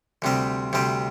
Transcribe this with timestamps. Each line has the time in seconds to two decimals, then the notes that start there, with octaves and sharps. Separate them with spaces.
0.22 D2 C3 G3 C4
0.73 D2 C3 G3 C4